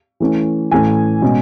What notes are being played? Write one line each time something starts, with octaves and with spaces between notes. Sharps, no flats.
E3 A3 C#4
A2 E3 A3 C#4 G#5
B2 G#3 C#4